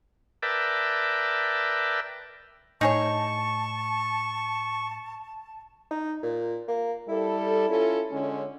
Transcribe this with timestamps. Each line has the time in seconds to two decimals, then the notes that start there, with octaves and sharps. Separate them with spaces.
0.42 A#4 B4 D5 E5 G5 A5
2.81 A2 D#4 G#4 C#5 A5 C#6
5.91 D#4
6.23 A#2
6.68 A#3
7.09 G3 E4 A4
7.69 C#4 F4 A4
8.11 D3 G#3 C#4